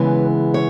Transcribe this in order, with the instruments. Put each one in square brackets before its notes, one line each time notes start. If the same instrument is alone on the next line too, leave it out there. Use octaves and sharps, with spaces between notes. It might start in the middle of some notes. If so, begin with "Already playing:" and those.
Already playing: [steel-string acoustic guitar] C#3 E3 G#3 B3 B4
C#5